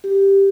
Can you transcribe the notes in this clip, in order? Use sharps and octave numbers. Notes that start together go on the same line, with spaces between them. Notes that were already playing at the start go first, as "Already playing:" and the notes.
G4